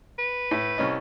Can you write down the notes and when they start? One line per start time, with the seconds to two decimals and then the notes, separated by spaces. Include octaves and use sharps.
0.19 B4
0.51 A2
0.78 C2 C#4 D#5